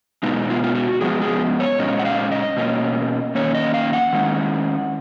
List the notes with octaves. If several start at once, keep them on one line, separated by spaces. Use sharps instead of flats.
B2 G#3 B3 D#4
F4
F4
F#4
F3 G#3 B3 G#4
G#4
C#5
A#2 G#3 C#4 D#5
F#5
F5
D#5
B2 A#3 C#4
D#3 A#3 C#4 C#5
D#5
F5
F#5
D#3 G#3 C#4